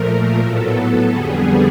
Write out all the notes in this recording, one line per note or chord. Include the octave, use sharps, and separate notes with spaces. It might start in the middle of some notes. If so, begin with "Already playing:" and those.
Already playing: A#2 F3 A3 A#4
A2 F#3 B3 A4
F2 D3 G3 B3 G#4